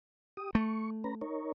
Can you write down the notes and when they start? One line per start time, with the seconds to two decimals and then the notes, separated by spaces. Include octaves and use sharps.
0.37 G4 D#6
0.55 A3 C#6
1.04 C#4 B4 A#5
1.21 D#4 A#4 C#5